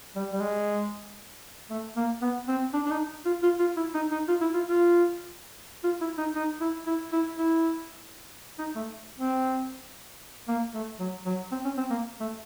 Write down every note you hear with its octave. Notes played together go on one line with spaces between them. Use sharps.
G3
G3
G#3
A3
A#3
B3
C4
D4
D4
D#4
F4
F4
F4
E4
D#4
D#4
F4
E4
F4
F4
F4
E4
D#4
D#4
E4
E4
E4
E4
D#4
A3
C4
A#3
A3
F#3
F#3
C4
C#4
C4
A#3
A3